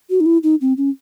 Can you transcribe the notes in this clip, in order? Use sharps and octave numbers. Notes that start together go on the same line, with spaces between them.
F#4
D#4
E4
D#4
C4
C#4